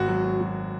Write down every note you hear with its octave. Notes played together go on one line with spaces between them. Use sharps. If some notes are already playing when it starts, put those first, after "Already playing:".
Already playing: G#1 F#4
F#3
F#3
F#3